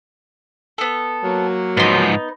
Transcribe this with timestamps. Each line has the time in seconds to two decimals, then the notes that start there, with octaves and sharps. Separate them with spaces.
0.78 B3 A4
1.23 F#3 A#3
1.77 G#2 F3 B3 D#4